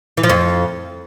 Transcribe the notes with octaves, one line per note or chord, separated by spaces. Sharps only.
E3
F3
F2